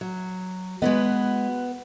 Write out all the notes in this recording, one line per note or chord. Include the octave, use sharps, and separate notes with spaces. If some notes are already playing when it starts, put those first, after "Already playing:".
F#3
G#3 B3 F#4 B4 D#5